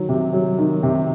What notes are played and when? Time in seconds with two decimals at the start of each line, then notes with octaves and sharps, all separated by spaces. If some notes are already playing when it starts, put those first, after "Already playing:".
Already playing: D#3 F#3
0.09 C3
0.33 F#3
0.59 D#3
0.83 C3